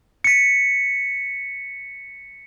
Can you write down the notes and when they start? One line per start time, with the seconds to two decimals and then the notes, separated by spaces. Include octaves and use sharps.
0.24 B6 C#7